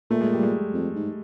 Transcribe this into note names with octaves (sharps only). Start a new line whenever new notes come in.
A#2 A3
G#3
G3
G#3
F2
G#2